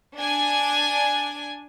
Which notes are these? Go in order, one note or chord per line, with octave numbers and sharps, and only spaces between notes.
D4 G#5